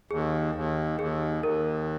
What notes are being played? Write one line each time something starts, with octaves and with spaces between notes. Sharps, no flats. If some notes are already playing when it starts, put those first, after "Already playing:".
D#2 G#4
D#2
D#2 G#4
D#2 A#4